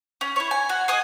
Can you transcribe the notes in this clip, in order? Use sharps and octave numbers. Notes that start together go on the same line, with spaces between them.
C#4
E4 C#5
G#5
F#4
G#4 D#5 G#5 D#6